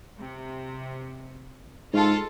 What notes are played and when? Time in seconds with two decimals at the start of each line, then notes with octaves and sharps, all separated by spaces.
0.19 C3
1.93 G#2 F4 A4